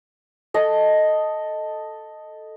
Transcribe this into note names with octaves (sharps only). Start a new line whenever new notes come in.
A4 D#5